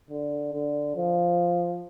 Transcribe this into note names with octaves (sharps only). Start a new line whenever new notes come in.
D3
D3
F3